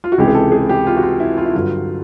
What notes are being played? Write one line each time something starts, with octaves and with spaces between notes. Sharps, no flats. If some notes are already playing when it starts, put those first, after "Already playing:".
F4
F#4
C#2 C3 E3 G#3 G4
G#4
A4
G#4
G4
F4
F#4
F4
E4
F4
E4
G2 D3 F#3 F4